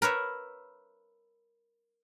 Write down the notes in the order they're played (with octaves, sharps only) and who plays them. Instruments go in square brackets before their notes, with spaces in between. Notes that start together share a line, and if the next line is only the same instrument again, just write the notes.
[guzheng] A#4 B4 C#5 E5